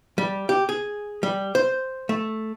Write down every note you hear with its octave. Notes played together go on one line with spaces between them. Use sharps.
G3
G4
G#4
G3
C5
A3